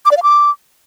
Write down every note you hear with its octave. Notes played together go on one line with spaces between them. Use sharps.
D6
D5
F5
D6